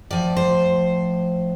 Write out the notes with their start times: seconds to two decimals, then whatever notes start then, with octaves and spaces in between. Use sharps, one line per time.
0.10 A2 F3 D5
0.37 C5